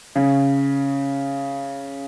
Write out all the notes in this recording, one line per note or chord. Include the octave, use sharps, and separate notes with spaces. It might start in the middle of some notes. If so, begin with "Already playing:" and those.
C#3